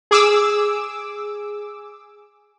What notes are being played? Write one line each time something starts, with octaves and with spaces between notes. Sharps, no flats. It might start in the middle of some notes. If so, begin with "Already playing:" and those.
G#4 D6 E6